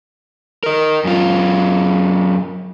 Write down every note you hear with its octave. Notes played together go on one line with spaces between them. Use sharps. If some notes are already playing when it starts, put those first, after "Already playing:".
A#4 D#5
F#2 F4